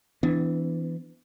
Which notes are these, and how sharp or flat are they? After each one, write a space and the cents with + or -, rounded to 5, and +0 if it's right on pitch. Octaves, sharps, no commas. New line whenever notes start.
E3 +0 B3 +40 D4 +0